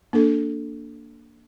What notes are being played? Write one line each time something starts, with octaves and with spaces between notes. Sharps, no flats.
A#3 D4 A4